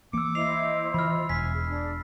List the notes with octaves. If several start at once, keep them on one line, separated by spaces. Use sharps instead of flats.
E3 A#3 D6 E6 C#7
E4 C5 D#5 C7 F7
E3 F4 B5 F6
E1 G#5 B6
G#4
D4